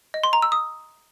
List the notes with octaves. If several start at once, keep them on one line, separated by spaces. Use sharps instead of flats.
D#5
C6
A#5
E6
D#6